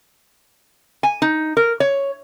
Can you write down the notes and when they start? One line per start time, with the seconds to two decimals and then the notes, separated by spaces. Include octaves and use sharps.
1.03 G#5
1.22 D#4
1.57 A#4
1.80 C#5